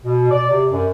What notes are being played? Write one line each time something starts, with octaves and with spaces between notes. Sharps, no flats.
B2
D5
C3
F#2